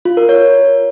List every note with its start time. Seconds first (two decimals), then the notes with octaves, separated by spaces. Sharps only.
0.05 F4
0.17 A#4
0.29 C#5